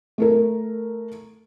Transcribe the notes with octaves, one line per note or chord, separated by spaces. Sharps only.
A3 A4 A#4